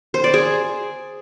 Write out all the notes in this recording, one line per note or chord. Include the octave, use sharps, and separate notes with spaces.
C5
D5
G#4